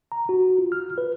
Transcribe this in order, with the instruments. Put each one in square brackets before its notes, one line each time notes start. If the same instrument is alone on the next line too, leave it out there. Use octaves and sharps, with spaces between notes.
[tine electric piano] A#5
F#4
F4
F6
B4